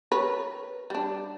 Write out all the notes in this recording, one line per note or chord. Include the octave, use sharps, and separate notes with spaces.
A#4 B4 C#5
G3 D4